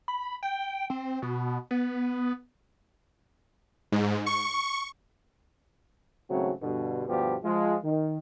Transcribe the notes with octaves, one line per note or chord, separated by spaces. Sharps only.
B5
G5
C4
B2
B3
G#2
C#6
G#1 C#3 F#3 A3 C4 F#4
G2 B2 D3
D2 G2 B2 F3 B3 G4
F3 G#3 F4
D#3